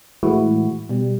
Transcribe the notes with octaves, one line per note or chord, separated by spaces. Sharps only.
A2 E3 G#3 E4 F#4
B2 G3